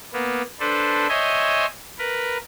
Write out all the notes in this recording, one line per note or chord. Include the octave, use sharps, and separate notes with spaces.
A#3 B3
D4 A4 B4 C5
C5 C#5 D#5 E5 G#5 C6
A#4 B4